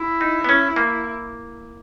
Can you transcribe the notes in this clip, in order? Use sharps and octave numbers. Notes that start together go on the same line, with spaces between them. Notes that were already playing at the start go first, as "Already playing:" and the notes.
Already playing: E4
D#4
B3
C#4
A#3